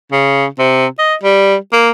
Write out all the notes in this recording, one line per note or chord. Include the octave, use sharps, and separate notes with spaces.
C#3
C3
D#5
G3
A#3